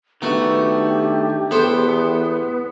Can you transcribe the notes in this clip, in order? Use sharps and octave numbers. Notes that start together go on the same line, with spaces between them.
D#3 A3 B3 D4 F#4 G4
E2 B3 A4 C5 G5